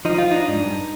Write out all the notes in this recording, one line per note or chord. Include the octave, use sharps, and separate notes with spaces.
F3 D#4
F3 F4
D4 D#4
G#2
G2